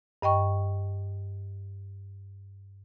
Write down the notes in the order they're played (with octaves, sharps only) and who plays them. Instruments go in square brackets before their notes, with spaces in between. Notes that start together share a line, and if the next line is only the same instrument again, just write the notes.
[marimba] G2 D#5 G5 C#6